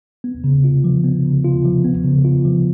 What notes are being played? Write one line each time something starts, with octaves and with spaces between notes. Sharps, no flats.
B3
C#3
F4
F3
B3
C#3
F4
F3
B3
C#3
F4
F3